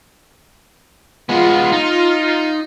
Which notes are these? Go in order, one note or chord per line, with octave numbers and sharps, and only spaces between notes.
G#3 B3 F4
D#4